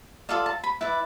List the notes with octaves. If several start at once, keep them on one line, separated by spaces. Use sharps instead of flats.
F4 A4 D5 F5
A5
B5
E4 B4 D5